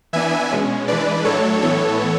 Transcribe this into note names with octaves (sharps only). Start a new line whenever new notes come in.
E3 B3 D4 E5 G#5
B2 G#3 C#4
E3 G#3 D4 B4 D5
A2 F#3 A3 D4 A4 C#5
A2 E3 B3 A4 C#5